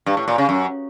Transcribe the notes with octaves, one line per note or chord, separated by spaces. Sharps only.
G2
A2
A#2
C#3
F#2